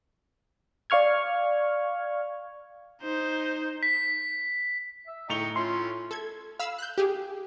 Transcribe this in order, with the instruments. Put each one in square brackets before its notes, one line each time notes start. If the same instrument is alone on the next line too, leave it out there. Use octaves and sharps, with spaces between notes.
[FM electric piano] D5 F5 C#6 F6 G#6
[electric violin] D#4 C5
[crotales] B6
[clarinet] E5
[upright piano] A2 F7 G7 [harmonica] D#4 G5 [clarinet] C#6
[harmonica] C#4 E4 [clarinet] F4 [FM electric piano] C6
[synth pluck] A4 G#6
F5 B5 E6
F#6 G6
G4 G#4